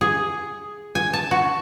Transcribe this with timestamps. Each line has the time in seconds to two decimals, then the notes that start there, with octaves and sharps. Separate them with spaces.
0.01 G#4
0.95 G#5
1.13 A5
1.31 F#4